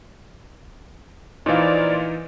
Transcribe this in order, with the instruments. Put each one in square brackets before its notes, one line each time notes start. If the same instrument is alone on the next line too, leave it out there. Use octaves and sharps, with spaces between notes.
[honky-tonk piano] A#2 F4 [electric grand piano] E3 D#4 [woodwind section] F3 D5